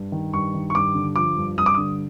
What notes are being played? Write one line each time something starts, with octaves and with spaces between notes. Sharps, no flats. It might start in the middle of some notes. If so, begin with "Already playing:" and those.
Already playing: G2
D#3
G2 C#6
D#3
C#6
G2 D6
D3
F3 D6
G2
G2 D#6
D6
D3 D#6